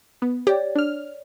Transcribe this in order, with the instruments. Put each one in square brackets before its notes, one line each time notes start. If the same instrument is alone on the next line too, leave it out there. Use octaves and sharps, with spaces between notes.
[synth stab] B3
[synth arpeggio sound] G4 [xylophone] C#5 D5
[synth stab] D4 F6